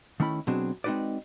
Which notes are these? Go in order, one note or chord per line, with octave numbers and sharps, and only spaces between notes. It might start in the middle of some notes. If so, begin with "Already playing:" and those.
D#3 A3 C#4 E4 B5
B2 F#3 C4 D4 G#4
G#3 C4 D#4 F#4 B4 D5